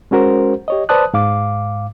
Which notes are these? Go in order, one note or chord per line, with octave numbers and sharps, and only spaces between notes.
G#3 C#4 F#4 A#4 C5
G4 C#5 D#5
B4 C5 D5 A5 D#6 F#6
G#2 F5 D6